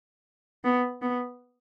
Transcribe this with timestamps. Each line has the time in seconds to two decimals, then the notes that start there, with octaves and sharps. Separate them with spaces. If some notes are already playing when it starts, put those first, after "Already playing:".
0.64 B3
1.02 B3